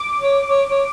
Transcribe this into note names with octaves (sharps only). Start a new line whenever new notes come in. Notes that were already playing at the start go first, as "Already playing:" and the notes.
Already playing: D6
C#5
C#5
C#5